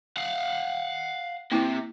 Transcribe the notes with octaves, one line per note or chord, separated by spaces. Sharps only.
F5 F#5
C3 A#3 E4